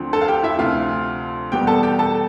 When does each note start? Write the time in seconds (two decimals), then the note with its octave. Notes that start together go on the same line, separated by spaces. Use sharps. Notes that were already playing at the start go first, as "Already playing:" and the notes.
Already playing: D2 D3 F3 C4
0.13 A4 A5
0.22 F5
0.28 G4 G5
0.43 E4 E5
0.59 D2 C3 F3 F4 F5
1.52 E2 B2 G3 B3 G4 G5
1.67 A4 A5
1.83 G4 G5
1.99 A4 A5